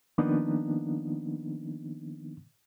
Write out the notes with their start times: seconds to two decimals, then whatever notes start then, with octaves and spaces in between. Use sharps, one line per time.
0.18 D#3 F3 A#3 B3 D4 D#4